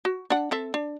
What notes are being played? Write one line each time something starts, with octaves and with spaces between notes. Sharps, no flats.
F#4
D4 F#5
C4 A4 E5
D4